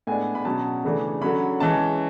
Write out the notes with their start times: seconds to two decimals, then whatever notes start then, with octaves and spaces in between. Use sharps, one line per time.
0.07 A2 G#3 B3 D4 G#5
0.35 B5
0.45 B2 F#3 C#4 A5
0.84 C#3 E3 A3 D4
1.22 D3 F#3 C#4 B5
1.60 E3 G#3 C#4 A5